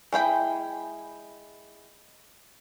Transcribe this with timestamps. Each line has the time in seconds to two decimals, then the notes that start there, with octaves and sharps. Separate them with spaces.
0.13 G#3 E4 G5 B5